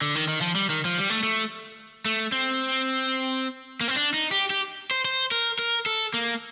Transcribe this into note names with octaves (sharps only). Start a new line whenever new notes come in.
D3
D#3
D#3
F3
G3
D#3
F3
G3
A3
A3
A3
C4
A#3
C4
D4
D#4
G4
G4
C5
C5
A#4
A#4
A4
A#3